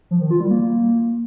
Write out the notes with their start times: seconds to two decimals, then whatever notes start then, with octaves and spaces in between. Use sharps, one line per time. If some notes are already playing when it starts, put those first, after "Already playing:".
0.11 F3
0.21 D#3
0.30 F4
0.40 G3
0.50 A#3